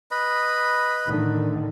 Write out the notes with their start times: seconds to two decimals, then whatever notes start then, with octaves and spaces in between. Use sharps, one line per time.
0.11 B4 D#5 B5
1.07 A2 D3 D#3